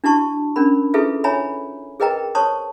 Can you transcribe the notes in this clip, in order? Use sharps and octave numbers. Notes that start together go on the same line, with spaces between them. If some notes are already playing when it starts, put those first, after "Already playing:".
D4 E4 F#4 A5 C#6
C#4 D4 A#4 B5
E4 F4 G#4 A4 B4 E5
C#5 E5 G#5 A#5 B5
G#4 A#4 B4 D#5 G5 A#5
C5 C#5 A5 C6 C#6 D#6